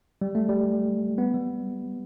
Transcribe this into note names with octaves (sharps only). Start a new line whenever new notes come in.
G3
A3
G3
B3
G3